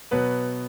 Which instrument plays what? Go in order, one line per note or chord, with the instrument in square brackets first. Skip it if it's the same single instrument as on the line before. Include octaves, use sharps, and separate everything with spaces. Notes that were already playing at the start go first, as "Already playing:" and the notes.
[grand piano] B2 F#3 B3 B4